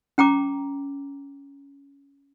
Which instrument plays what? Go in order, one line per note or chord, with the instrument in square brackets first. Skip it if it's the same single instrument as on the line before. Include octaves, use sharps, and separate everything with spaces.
[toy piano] C#4 G5 A#5 D6